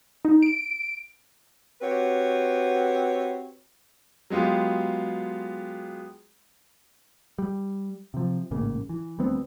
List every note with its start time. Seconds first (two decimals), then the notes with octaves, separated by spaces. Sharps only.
0.25 D#4
0.43 D7
1.81 C4 F#4 G4 B4 C#5
4.30 F#3 G#3 B3 F4 G4
7.39 G3
8.14 C3 F3
8.51 A1 G#2 C#3 A#3
8.89 E3
9.19 D2 G3 B3 C4